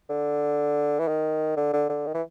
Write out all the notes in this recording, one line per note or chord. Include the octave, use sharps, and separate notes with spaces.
D3
E3
D#3
D3
D3
D3
D#3
E3